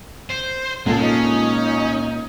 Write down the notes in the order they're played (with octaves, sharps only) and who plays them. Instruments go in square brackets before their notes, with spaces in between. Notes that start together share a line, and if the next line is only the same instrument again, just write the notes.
[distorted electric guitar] C5
[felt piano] C#2 F4 [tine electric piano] A#2 A#3 [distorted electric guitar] G#3 [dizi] A4
[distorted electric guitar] C#4 [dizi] D#4